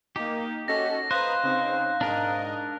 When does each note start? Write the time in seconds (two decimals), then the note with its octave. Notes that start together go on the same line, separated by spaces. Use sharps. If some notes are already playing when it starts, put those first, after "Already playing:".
0.16 A#3 D#4 G4
0.68 C#4 F#4 A4 D#5 A#6
1.11 B4 C5 F5 A#5 D#6 F#6 A#6
1.43 C#3 C4 D#4
2.01 G#2 D4 A#4 D#5